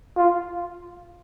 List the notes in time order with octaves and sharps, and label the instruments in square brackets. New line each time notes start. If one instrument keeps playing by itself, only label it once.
[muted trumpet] F4